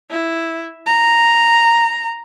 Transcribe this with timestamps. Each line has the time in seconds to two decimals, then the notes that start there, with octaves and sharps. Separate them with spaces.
0.11 E4
0.86 A#5